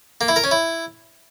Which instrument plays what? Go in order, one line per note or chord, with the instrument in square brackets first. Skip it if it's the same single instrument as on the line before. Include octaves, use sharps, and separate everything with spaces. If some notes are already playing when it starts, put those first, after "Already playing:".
[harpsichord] A#3
E4
A#4
C#4
E4